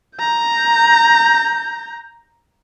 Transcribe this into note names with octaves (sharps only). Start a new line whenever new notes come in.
A#5 G6